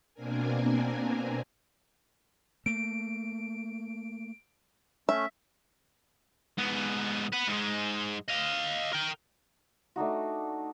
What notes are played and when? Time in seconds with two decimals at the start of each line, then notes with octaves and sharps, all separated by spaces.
0.14 B2 A#3 C4 D4 A#4 G#5
2.66 A3 A#3 D7
5.09 A3 C#4 E5
6.58 G#2 B3
7.33 B4 F#5
7.48 G#2 G#3
8.29 D#5 F5
8.93 A#4 G5
9.96 A3 D4 D#4 F#4